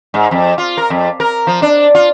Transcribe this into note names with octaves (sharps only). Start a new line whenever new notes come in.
G#2
F2
F4
A#4
F2
A#4
F3
D4
F4